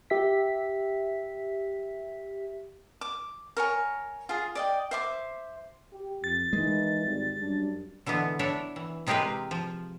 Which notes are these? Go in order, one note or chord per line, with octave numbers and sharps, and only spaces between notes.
G4 E5 B6
D6
A#4 C#5 G#5
F4 G#4
D5 D#5 G5
C5 E5 D6
G4
F2 A6
D#3 E3 G#3
G#1 G3
F#2 G3 D4
D3 E3 G#3 B3
D4 E4 C#5
E3
C3 G#3 C4 G4 A#4 B4
F3